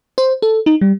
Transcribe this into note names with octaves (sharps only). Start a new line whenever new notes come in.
C5
A4
D#4
G3